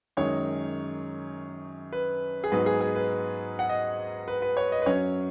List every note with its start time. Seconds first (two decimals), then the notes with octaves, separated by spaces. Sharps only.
0.17 F#2 D#3 G#3 D#4 C#5
1.93 B4
2.44 G#4
2.52 G#2 F#3 B3 D#4 B4
2.66 G#4
2.81 G#4
2.96 B4
3.59 F#5
3.69 D#5
4.28 B4
4.42 B4
4.57 C#5
4.72 D#5
4.82 B4
4.86 F#2 F#3 C#4 C#5